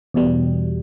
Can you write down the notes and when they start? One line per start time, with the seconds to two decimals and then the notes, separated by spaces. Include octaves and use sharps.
0.14 E2 B2 G3